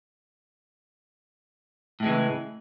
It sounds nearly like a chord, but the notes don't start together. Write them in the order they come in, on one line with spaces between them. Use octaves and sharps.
A2 G#3 E3 C#3